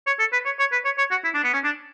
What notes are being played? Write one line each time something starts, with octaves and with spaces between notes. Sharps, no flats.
C#5
A4
B4
C#5
C#5
B4
C#5
C#5
F#4
E4
D4
B3
C#4
D4